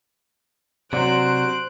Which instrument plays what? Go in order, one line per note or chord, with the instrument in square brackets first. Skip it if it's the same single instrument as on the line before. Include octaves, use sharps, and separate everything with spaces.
[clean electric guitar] C3 [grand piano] F#3 D4 F#4 [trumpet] C5 [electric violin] F#6 D7